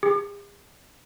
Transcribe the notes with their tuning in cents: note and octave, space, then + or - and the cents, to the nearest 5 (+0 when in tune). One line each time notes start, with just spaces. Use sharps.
G#4 -45